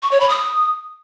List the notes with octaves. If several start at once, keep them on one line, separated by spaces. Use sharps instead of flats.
C#6
C#5
B5
D#6